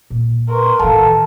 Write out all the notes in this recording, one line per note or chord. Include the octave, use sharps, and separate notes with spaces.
A#2
A#4 B4 C6 C#6
A1 D#3 A4 F5 F#5 A5